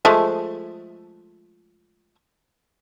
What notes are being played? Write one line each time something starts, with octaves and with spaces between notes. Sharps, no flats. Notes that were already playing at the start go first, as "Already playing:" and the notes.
F3 G#3 A3